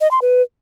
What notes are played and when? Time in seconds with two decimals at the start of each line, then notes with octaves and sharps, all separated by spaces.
0.01 D#5
0.11 C6
0.22 B4